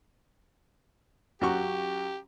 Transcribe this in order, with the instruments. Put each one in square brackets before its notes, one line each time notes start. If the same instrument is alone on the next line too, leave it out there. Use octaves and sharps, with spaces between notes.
[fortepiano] F#2 F#4 C#6 [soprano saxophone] G4